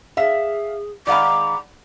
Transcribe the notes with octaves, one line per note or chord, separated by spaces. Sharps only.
G#4 E5 F5
D#3 G#3 D5 F5 F#5 A#5 B5 D6